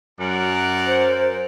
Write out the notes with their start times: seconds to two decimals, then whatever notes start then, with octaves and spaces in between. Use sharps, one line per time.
0.20 F#2 A#4 D5 F#5
0.87 C5